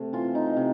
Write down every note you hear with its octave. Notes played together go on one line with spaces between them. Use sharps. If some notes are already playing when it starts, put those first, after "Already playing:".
Already playing: C3 A3
E3 F4
D#4
C3